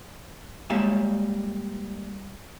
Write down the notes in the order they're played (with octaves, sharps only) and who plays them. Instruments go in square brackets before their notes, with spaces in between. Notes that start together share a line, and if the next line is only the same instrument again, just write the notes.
[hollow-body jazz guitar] G3 G#3 A#3 C#5 E5 F5